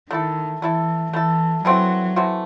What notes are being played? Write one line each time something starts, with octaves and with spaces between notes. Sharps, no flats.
D#3 A3 E4 A4
E3 A3 E4 A4
E3 A3 E4 A4
E3 F#3 A3 C4 F#4
E3 A3 C4 F#4